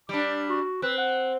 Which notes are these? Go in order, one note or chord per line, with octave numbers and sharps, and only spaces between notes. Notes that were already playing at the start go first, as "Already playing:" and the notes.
G3 D4 D6
F#4
C4 B4
F#5